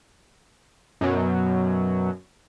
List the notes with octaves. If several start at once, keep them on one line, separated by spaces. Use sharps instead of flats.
F#2 B2 F#3